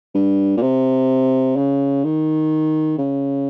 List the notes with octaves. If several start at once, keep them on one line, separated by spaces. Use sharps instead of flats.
G2
A#2
C3
C#3
D#3
C#3